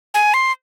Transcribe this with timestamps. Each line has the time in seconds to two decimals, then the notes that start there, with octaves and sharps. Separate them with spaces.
0.14 G#5
0.34 C6